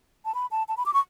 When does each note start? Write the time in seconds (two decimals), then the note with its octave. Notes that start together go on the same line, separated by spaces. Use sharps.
0.25 A5
0.35 B5
0.51 A5
0.68 A5
0.77 B5
0.86 D6
0.94 C#6